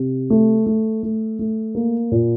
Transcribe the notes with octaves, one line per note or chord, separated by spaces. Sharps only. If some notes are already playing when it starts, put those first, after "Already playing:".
Already playing: C3
A3
A3
A3
A3
A#3
A#2